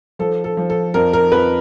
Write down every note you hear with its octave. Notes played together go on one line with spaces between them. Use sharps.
F3 A4
A4
F3
A4
F2 A#4
A#4
F2 B4